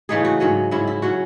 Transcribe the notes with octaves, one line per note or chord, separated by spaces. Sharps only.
C#3 E3 A3 D#4 G#4
F#4
G#2 F#3 C#4
G#2 F#3 C#4 E4
E4
F#3 C#4 F#4